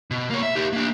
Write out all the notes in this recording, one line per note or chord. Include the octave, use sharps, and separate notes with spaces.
B2
A#3 C#5
E5
D#4 G4
A#3 D4